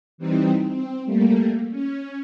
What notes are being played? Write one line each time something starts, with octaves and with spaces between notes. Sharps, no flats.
E3 G3 C4 D#4
C4
G3 A3 A#3
C#4